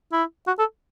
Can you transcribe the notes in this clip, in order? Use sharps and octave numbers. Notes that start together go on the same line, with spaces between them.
E4
F#4
A4